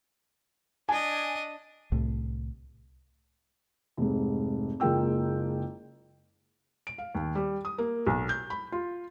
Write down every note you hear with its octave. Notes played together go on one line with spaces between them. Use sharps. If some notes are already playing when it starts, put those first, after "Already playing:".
D4 D#5 G#5
C2 A2
F1 G#2
F#1 G#3 A#3 F4 G5 E6
D7
F5
D#2
G3
D#6
A#3
B1
G6
B5
F4